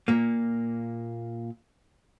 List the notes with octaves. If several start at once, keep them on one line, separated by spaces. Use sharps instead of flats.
A#2 A#3